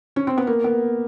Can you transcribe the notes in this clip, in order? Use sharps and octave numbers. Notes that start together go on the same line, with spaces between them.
C#4
C4
B3
A#3
B3